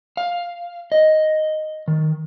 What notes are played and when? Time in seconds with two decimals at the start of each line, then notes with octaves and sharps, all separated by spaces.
0.17 F5
0.92 D#5
1.88 D#3